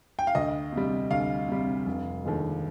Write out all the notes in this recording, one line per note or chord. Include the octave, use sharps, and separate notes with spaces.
G5
F5
D2 D#5
C3 G3
D2 F5
C3 G3
F1
D#2 D3 F3 G#3